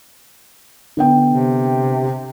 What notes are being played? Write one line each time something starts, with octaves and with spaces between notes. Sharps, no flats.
D3 B3 G5
C3